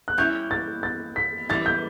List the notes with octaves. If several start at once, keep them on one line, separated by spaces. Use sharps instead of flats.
F#6
G3 C#4 E4 G6
A6
A6
B6
F#2 E3 G3 A6
G6